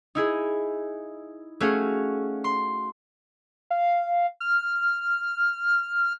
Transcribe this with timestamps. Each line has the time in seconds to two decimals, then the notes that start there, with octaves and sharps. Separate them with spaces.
0.15 D#4 E4 G#4
1.60 A3 C#4 F#4 G#4 F5
2.44 C6
3.71 F5
4.40 F6